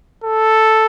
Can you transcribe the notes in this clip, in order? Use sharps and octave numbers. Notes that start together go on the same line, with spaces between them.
A4